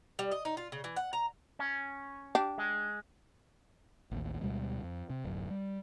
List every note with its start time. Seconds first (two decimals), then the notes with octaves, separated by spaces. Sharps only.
0.19 G3
0.32 D#5
0.45 D#4
0.57 F4
0.72 C#3
0.84 E3
0.97 F#5
1.13 A#5
1.59 C#4
2.35 D4 G4
2.58 G#3
4.11 A1 D#2
4.41 D2 B2 G3 G#3
4.83 F2
5.10 C3
5.25 D1 F#2
5.50 G3